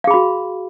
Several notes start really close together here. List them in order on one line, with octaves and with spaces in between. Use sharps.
F5 G#4 B5 F#4